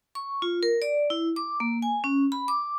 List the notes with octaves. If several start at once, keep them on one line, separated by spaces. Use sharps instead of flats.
C#6
F4
A#4
D5
E4
D6
A#3
G#5
C#4
B5
D6